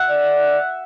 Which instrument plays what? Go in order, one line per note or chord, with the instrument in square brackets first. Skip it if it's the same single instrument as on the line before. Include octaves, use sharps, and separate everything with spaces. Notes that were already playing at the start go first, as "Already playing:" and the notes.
Already playing: [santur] E5 F#5
[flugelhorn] D5